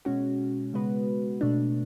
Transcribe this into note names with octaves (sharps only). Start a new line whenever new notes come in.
B2 G#3 C#4 F#4
C#3 G#3 B3 F#4 B4
B2 A3 D4